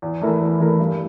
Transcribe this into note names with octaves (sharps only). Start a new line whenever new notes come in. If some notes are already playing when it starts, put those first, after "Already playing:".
E2
E3 A3 E4 A#4
E2
E3 A3 E4 A#4
G2